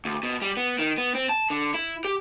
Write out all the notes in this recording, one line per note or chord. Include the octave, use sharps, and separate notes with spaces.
D2
B2
G3
B3
D#3
B3
C4
A5
D3
E4
G4